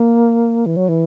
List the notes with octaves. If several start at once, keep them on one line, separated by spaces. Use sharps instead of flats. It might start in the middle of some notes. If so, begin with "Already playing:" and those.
Already playing: A#3
E3
F#3
E3